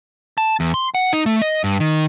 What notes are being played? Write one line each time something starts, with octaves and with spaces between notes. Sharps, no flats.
A5
E2
C6
F#5
D#4
A3
D#5
G2
D#3